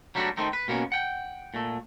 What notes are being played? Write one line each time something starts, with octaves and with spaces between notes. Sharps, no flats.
F#3 G3 A3 D4 F#4
D#3 A3 C4 D#4
B4
B2 A#3 B3 C#4
F#5 G5
A#2 A3